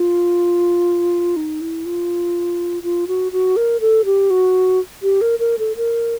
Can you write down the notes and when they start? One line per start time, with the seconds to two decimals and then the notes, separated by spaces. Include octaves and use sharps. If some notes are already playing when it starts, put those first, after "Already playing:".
Already playing: F4
1.36 D#4
1.61 E4
1.85 F4
2.83 F4
3.08 F#4
3.32 F#4
3.56 A#4
3.81 A4
4.05 G4
4.30 F#4
5.03 G4
5.21 A#4
5.39 A#4
5.59 A4
5.77 A#4